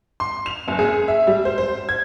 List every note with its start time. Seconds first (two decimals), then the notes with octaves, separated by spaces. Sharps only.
0.20 C6
0.46 F7
0.68 F#1
0.79 G#4
1.08 E5
1.27 G3
1.45 C5
1.58 C5
1.89 G#6